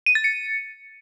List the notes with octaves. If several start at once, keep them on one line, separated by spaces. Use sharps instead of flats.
D#7
A6
C#7